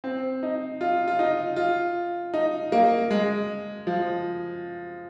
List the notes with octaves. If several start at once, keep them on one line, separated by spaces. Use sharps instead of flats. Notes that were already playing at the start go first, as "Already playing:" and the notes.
C4
D#4
F4
F4
D#4
F4
D#4
A#3
G#3
F3